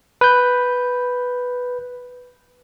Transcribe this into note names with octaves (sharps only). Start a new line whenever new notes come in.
B4 G6